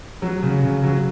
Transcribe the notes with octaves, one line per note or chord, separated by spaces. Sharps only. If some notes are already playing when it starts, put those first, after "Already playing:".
F#3
C#3
C#3
F#3